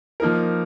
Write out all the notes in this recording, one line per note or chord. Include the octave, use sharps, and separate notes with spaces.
F3 A#3 D#4 A#4